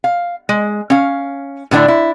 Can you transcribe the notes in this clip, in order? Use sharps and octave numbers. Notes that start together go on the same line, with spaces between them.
F5
G#3
C#4 F5
A2 D3 B3 D4 E4
E4